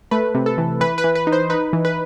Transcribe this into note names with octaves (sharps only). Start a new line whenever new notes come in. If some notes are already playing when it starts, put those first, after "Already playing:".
A3 B4
C3
A4
E3
E3 B4
B4
E3
B4
D#4
C5
D#4 B4
E3
B4